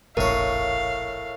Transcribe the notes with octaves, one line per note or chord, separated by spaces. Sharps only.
F1 A#1 A2 A#4 C#5 F5